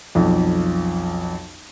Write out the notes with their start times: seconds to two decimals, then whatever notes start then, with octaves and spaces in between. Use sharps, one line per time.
0.15 B1 F2